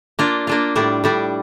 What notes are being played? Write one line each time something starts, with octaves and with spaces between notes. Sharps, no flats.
A#3 D4 F4
A#3 D4 F4
A2 G3 D4
A2 G3 D4